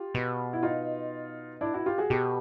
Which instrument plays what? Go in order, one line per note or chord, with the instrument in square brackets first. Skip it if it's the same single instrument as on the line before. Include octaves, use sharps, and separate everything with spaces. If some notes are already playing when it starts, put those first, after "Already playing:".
Already playing: [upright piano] F4 G4
[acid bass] B2
[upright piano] E4
D#4 F4
D4 E4
E4 F#4
F4 G4
F#4 G#4
[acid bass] B2 [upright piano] G4 A4